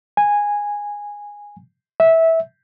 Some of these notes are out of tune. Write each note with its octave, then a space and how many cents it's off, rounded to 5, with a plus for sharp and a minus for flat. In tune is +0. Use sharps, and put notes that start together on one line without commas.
G#5 -10
E5 -15